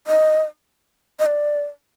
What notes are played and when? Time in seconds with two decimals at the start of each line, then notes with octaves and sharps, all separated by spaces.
0.07 D#5
1.19 D#5
1.26 D5